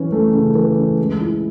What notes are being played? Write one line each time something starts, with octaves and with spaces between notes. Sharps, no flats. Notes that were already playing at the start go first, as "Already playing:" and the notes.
Already playing: E3 C#4
A3
C#3
E3
C#4
G#3
E4